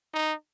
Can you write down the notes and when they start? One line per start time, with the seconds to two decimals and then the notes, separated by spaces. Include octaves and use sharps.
0.12 D#4